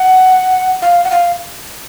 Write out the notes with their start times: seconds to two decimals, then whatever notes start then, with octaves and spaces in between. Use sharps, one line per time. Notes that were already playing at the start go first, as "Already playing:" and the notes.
Already playing: F#5
0.82 F5
1.04 F#5
1.11 F5